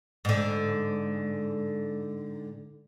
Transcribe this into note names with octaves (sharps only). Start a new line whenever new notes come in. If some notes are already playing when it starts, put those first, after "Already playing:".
G#2 D3